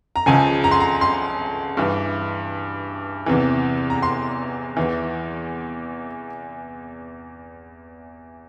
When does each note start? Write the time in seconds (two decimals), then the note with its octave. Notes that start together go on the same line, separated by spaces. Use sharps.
0.16 A#5
0.26 C#2 C#3 F3 G#5
0.64 A#5
0.71 C6
0.80 A#5
1.01 C6
1.77 G2 E3
3.26 E2 C3 E3
3.90 A#5
4.03 C6
4.77 E2 E3